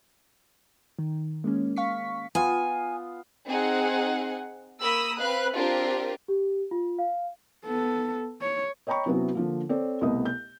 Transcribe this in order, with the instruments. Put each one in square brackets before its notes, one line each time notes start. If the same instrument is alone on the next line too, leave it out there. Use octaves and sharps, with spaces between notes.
[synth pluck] D#3
G#3 A#3 C#4
F5 C#6 B6
[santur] B3 F4 [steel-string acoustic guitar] G#5
[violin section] C4 D#4 G#4 F#5
A#3 A#4 B5 D#6 E6
C4 B4 F5 F#6
C4 D4 F4 G4 A#4
[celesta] G4
F4
F5
[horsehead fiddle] B3 A4
C#5
[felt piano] C#5 D#5 G5 A#5 B5 C#6
C3 F#3 B3 C#4 E4 F#4
D3 F3 A#3
C4 A4 C#5 D5
C2 B2 A3 B3 D#5 D#6
G6